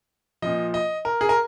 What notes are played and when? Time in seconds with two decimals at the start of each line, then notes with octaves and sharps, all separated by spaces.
0.42 A#2 F3 D#5
0.74 D#5
1.05 A#4
1.21 G#4
1.29 A#4